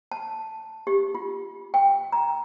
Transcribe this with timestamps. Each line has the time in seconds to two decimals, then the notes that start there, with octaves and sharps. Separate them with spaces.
0.12 A5
0.87 G4
1.15 F4
1.74 G5
2.12 A#5